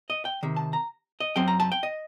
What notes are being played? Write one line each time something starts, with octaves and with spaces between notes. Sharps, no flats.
D#5
G5
C3 D#3
A5
A#5
D#5
F#2 F#3 C4 G5
A#5
A5
G5
D#5